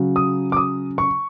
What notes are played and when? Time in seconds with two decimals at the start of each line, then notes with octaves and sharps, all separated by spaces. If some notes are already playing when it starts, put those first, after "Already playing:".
Already playing: C#3 F#3
0.16 D#6
0.52 D6
0.57 D#6
0.98 C#6